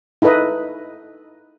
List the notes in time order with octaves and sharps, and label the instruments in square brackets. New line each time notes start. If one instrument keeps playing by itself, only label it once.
[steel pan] D#4 E4 A4 B4 D#5